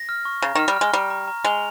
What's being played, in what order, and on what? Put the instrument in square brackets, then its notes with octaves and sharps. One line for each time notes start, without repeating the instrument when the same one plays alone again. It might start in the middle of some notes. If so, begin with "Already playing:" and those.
Already playing: [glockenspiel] A#6
F6
C#6
[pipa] C#3 [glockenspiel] A#5
[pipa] D#3 [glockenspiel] F6
[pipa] G3
[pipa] G#3 [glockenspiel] F6
[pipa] G3 [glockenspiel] A#5
[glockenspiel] A#5
A#5
[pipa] G#3 [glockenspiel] F7